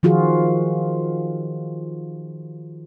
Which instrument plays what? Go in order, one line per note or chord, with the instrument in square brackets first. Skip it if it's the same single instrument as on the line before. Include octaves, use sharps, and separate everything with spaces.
[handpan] D#3 F3 F4 F#4 G#4